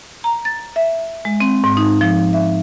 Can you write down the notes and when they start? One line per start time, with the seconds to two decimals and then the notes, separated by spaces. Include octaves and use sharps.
0.24 A#5
0.45 A6
0.76 E5
1.25 G#3
1.40 C4
1.64 G#2
1.77 D#4
2.01 F3
2.33 E5